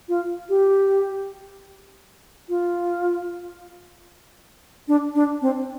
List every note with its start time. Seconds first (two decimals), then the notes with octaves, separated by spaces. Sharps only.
0.09 F4
0.49 G4
2.49 F4
4.88 D4
5.15 D4
5.42 C4